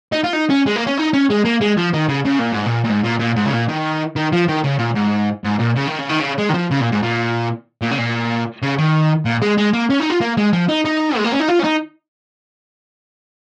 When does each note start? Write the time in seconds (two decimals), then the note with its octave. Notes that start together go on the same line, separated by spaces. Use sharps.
0.12 D#4
0.24 F4
0.33 D#4
0.50 C#4
0.66 G#3
0.76 A#3
0.87 C#4
0.97 D#4
1.13 C#4
1.30 G#3
1.45 A#3
1.61 G#3
1.77 F3
1.94 D#3
2.08 C#3
2.25 C#3
2.39 A#2
2.52 G#2
2.66 A#2
2.84 A#2
2.89 G#2
3.04 A#2
3.20 A#2
3.36 G#2
3.45 C#3
3.53 A#2
3.69 D#3
4.16 D#3
4.32 F3
4.48 D#3
4.64 C#3
4.79 A#2
4.95 G#2
5.44 G#2
5.59 A#2
5.75 C#3
5.87 D#3
5.98 C#3
6.09 D#3
6.20 C#3
6.39 G#3
6.50 D#3
6.54 F3
6.71 C#3
6.81 A#2
6.92 G#2
7.03 A#2
7.82 A#2
7.91 C#3
7.98 A#2
8.62 C#3
8.78 D#3
9.25 A#2
9.42 G#3
9.58 G#3
9.73 A#3
9.90 C#4
10.00 D#4
10.10 F4
10.21 A#3
10.37 G#3
10.53 F3
10.68 D#4
10.85 D#4
11.17 G#3
11.24 A#3
11.32 C#4
11.40 D#4
11.49 F4
11.60 C#4
11.64 D#4